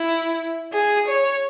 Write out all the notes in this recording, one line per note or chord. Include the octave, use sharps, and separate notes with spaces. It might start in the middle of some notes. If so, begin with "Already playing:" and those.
Already playing: E4
G#4
C#5